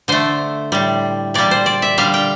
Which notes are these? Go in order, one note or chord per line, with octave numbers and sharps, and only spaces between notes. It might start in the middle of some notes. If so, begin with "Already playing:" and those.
D3 A3 C5
A2 G3
A#2 G3 D5
C5
D5
E5
D3 G3 F5
G5